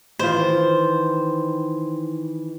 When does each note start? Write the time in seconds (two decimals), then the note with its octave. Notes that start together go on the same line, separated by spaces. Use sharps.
0.19 D#3 E3 F4 C5